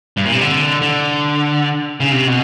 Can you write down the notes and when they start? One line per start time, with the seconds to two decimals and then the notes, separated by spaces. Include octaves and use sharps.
0.17 G2
0.25 A#2
0.33 C3
0.41 D3
0.82 D3
2.00 C#3
2.11 C3
2.27 B2